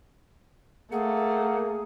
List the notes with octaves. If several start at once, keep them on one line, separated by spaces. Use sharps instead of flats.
A3 A#3 G#4 F#5